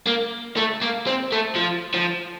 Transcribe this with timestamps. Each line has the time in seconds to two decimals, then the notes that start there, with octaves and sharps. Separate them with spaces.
0.07 A#3
0.57 A3
0.82 A#3
1.07 C4
1.32 A3
1.56 F3
1.94 F3